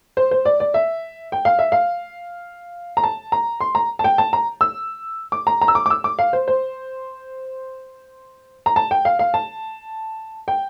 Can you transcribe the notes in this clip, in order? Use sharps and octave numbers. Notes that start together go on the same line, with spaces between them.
C5
C5
D5
D5
E5
G5
F5
E5
F5
A#5
A5
A#5
C6
A#5
A5
G5
A5
A#5
E6
D6
A#5
A#5
E6
D6
D6
E6
D6
F5
C5
C5
A#5
A5
G5
F5
F5
A5
G5